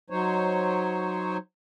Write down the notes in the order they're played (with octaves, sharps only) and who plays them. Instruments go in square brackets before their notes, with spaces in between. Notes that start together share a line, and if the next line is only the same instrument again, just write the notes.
[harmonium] F#3 D#4 C5 C#5